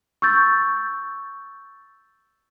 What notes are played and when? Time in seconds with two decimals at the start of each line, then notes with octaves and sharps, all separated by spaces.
0.22 C#6 E6 G6 A6